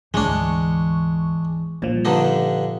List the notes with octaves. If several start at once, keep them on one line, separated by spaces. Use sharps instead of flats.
D2 G#2 E3 G#3 D4 C#6
A#2 F3 G3
G2 D3 D#4